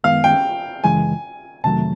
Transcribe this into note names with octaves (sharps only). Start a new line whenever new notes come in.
F#2 D#3 G#3 B3 F5
G5
F#2 C#3 E3 G#3 G#5
F2 C3 D#3 F#3 A3 A5